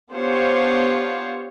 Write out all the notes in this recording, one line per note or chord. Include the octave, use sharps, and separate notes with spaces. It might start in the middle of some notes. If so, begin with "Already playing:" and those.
B3 D4 F4 G4 C5 C#5